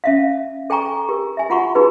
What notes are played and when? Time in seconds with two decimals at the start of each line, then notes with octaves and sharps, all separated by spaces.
0.04 C#4 E5 F5
0.70 A4 G5 G#5 A#5 C#6
1.09 G4 A#4
1.37 E5 G#5
1.50 F4 F#4 F#5 A#5 C6 C#6
1.75 D#4 F#4 G#4 B4